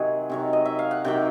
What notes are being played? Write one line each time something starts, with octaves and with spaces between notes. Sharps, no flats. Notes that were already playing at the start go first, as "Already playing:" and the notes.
Already playing: C3 D#3 F#3 G#4
C3 D#3 F#3
D#5
E5
F5
F#5
C3 D#3 F#3 G4 G5